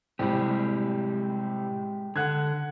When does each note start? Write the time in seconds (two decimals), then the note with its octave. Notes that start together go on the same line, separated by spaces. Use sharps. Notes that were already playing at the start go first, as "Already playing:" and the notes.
0.19 A2 C3 G3 G#3 G4
2.16 D3 F#5 F#6 G#6